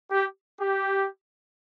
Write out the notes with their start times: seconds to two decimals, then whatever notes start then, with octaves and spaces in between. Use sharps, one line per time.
0.10 G4
0.61 G4